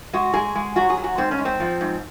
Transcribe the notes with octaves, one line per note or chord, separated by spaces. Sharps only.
G#3 F#4
G#3 G#4
G#3
F#3 F#4
G#4
F#3
F#4
G#2 C4
C#4
G#2
C4
F3
G#2